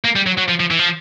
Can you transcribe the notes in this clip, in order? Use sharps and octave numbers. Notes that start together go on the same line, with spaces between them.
A#3
G3
F#3
F#3
F3
F3
E3
F3